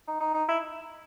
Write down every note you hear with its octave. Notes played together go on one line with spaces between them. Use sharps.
D#4
D#4
D#4
E4